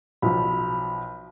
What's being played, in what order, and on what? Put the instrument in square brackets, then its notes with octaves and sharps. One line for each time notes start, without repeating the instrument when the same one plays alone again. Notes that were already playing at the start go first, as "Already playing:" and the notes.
[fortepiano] B1 F3 [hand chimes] B5